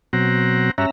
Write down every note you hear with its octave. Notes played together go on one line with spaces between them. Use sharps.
B2 F#3 C4 F#5 A#5
G2 C#4 F#4 E5 A#5